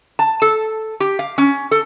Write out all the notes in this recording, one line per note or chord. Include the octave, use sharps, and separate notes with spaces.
A5
A4
G4
F5
C#4
A4